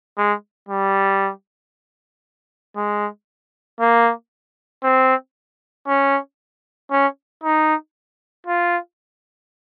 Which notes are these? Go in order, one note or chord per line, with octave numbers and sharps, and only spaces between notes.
G#3
G3
G#3
A#3
C4
C#4
C#4
D#4
F4